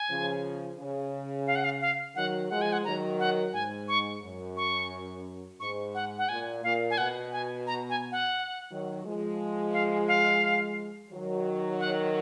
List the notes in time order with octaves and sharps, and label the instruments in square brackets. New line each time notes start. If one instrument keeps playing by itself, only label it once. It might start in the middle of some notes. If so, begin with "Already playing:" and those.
Already playing: [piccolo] G#5
[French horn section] C#3 F3
C#3
[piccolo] F5
F#5
F5
F5
[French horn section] D#3 F#3 [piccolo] F#5
[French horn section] F3 G#3 [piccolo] F#5
[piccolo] G#5
F#5
[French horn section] D#3 F#3 [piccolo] A#5
[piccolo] F#5
[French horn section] G#2 [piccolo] G#5
[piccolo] C#6
[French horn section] F#2
[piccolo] C#6
[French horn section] G#2 [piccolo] C#6
[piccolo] F#5
F#5
[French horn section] A#2 [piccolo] G#5
[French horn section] A#2 [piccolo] F5
[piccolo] G#5
[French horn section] B2 [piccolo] F#5
[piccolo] G#5
A#5
G#5
F#5
[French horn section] D#3 F#3
F3 G#3
[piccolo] F5
F5
[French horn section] D#3 F#3
[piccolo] F#5